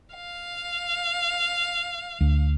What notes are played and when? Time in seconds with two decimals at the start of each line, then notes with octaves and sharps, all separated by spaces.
0.15 F5
2.21 D2